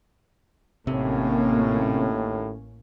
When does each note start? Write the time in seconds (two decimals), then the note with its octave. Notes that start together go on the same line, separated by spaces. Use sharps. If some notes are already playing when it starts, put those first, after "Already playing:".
0.87 A1 D#2 A2 C3 A#3 C#4